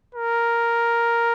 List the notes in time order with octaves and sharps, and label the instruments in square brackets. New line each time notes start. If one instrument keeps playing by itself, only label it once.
[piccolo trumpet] A#4